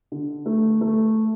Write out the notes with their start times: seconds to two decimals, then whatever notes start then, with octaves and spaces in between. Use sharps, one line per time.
0.12 D3
0.46 A3
0.81 A3